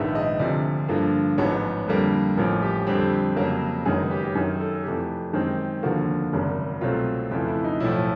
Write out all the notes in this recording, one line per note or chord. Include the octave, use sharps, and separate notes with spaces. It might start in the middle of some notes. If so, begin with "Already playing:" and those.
Already playing: A#1 G#2 D#3 G#3 B3 E5
D#5
D2 C3 F3 D5
G2 D3 F3 A#3
A1 G#2 F3 G#3 B3 C#5
F2 D3 G3 A#3
A1 A2 F3 A#4
G4
F2 D3 G3 C4 G4
F2 C#3 F#3 A#3
F#1 F#2 D#3 G#3 B3 G#4
G4
G4
F#2 D#3 F#3 G#4
A4
F2 C3 E3 A3 G4
F#2 D#3 G#3 C4
F1 D#2 D3 F3 A#3 F#4
G#1 F#2 C#3
C2 B2 F#3 A3 C4 F4
F2 C#3 E3 A3 F4
E4
D#4
B1 A2 F3 E4